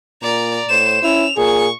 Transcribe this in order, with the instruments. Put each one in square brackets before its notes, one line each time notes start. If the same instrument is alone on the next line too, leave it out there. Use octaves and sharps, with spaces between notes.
[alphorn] A#2 [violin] D5 A#5
[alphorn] A2 [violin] C5 E7
[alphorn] C#4 [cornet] E4 [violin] E6 F7
[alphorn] A#2 [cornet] G#4 [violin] C#6